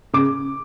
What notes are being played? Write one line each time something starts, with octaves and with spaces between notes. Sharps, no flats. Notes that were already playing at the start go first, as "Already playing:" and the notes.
C#3 D6